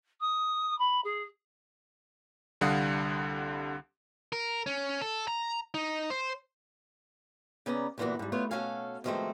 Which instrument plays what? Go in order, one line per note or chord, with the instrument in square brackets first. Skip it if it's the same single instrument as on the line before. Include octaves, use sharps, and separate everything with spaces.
[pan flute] D#6
B5
G#4
[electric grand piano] C2 D3 G3 F5 F#5 D#6
[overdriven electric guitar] A#4
C#4
A4
A#5
D#4
C5
[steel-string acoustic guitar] C#3 B3 C#4 D5 A#5
D2 G2 A#2 E3 B3 F#4
G#2 G3
A3 B3 F4 B4 C#5
B2 C#4 F#4 A4 F5 G#5
B2 D#3 F3 G#3 A3 C4